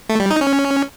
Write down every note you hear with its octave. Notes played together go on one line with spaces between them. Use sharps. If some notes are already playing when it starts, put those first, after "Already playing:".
A3
G3
D#4
C#4